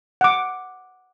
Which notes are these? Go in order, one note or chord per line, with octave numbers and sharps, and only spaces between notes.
F#5 D6